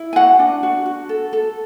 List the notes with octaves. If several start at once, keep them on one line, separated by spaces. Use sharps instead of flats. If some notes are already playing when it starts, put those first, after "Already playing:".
Already playing: E4
G#5
F#4 F#5
D4
F#4
F#4
A4
A4